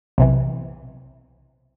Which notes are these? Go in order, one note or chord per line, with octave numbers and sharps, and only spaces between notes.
B1 C3 E3